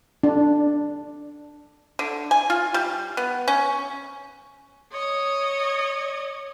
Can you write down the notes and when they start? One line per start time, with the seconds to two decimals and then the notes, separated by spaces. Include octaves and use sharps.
0.23 D4
1.99 D3
2.31 G#5
2.50 F4
2.74 G3
3.17 B3
3.48 C#4
4.92 C#5 D#5